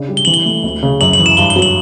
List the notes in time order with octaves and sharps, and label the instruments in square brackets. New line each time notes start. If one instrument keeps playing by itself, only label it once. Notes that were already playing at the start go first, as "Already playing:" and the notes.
Already playing: [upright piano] C#3 D4
G3
[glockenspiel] G7
[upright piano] E3 [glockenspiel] F#7
[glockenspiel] G7
[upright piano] A3
D2
C#3
[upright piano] F#2 [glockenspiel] F#7
[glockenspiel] F#7
[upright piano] E3
[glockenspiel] E7
[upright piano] G2 [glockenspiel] G7
[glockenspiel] G7
[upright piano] F#3
[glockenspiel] F#7